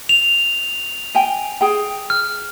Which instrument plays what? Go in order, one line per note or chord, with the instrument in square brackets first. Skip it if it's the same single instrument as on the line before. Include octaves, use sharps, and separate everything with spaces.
[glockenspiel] F7
[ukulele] G5 G#5
G#4 G5
[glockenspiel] F6